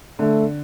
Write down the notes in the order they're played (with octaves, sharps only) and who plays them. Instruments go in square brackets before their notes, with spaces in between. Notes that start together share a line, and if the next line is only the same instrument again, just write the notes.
[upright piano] D3 [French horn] A3